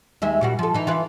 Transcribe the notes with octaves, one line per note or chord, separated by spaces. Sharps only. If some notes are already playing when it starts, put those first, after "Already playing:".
D#2 G#3 E5
A#2 G3 F#4
F3 A4
E3 D#4
E3 F4 B4